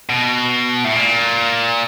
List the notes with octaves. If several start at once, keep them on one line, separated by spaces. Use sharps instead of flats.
B2
A2
A#2